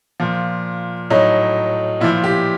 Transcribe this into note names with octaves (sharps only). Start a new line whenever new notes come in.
A#2 F3
A2 F#3 D#4
A#2 F3 E4
G4